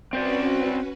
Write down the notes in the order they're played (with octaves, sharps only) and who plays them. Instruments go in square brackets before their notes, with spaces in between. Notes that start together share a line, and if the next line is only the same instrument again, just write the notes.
[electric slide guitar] C4 C5 D5 [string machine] C#4 F#4 B4